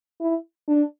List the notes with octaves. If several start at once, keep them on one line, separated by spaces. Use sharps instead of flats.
E4
D4